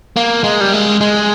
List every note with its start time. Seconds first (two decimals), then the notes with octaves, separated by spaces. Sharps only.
0.16 A#3
0.44 G#3
0.61 G3
0.73 G#3
1.01 G#3